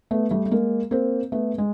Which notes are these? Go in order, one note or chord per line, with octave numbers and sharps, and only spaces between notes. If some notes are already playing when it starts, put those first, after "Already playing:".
A3 B3
G3 A3
A3
G#3 A#3
A#3 C4
A3 B3
G#3